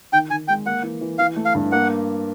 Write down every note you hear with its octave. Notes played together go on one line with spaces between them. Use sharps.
D#3 G5
D#3 G#5
G#3 G5
A#3 F#5
E3
E3
E3 F5
A3
F5
G2
A#3 F#5